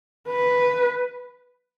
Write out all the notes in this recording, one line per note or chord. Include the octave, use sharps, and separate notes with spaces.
B4